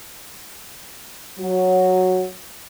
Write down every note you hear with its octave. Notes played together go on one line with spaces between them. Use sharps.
F#3